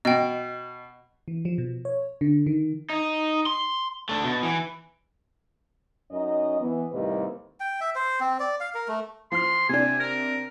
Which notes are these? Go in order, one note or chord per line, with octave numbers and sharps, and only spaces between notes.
B2 D#5 G5
E3
F3
B2
C#5
D3
D#3
D#4
C6
A3 D4
B2
E3
F#2 C#4 D#4 D#5
E3 B3
D#2 A2 C3 G3 B4 D#5
G5
E5
C5
C4
D5
F5
A#4
A3
F3 C6 F6
C3 D4 G#5
A#4